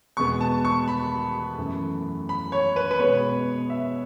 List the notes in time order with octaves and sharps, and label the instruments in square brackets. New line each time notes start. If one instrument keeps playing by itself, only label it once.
[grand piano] E2 B2 G#3 B3 C#6
A5
C#6
B5
F#2 E3 A3
B5
C#5
B4
B4
B2 G#3 B3 C#5
E5